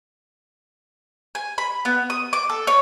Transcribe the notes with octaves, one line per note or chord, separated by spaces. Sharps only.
G#5
B5
B3
D#6
D6
A4
C#5